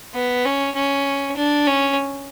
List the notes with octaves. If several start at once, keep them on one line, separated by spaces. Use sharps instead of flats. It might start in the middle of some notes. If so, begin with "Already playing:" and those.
B3
C#4
C#4
D4
C#4